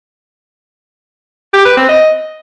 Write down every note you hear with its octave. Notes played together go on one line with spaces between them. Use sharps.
G4
B4
C4
D#5